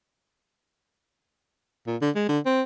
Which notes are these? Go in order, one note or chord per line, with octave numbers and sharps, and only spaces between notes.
A#2
D3
G#3
D3
C4